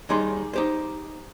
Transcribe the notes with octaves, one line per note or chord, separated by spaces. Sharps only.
D#2 D#3 G3 D#4 G#4 C6
D#4 G4 C5